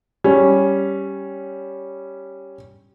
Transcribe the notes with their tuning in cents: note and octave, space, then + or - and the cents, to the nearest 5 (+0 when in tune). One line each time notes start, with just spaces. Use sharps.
G3 +0 C#4 +0